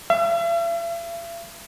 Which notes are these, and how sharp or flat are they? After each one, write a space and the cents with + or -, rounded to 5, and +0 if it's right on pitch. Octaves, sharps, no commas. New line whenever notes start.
E5 +45